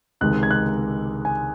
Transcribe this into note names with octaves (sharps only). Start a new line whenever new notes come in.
C#2 C3 D#3 G#3 F#6
G#6
F#6
G#5